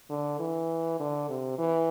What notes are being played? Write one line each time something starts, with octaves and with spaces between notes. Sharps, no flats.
D3
E3
D3
C3
E3